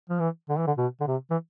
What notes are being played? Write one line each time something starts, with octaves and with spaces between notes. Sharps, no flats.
F3
E3
D3
E3
D3
B2
D3
C3
E3